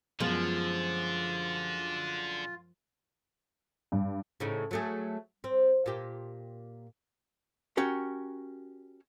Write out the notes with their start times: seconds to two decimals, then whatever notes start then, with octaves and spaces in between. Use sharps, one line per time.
0.20 F#2 D3 F3 G#3 B3 F4
3.92 G2
4.40 A2 C#3 D#4
4.71 F#3 A3 G#4
5.44 C4
5.86 A#2 G4
7.77 C#4 F#4 G4 A#4